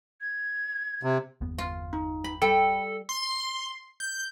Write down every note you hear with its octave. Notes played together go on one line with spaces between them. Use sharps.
G#6
C3
G1 E2 B3
F4
D#4
B5
G3 A4 G5 B5
C6
G6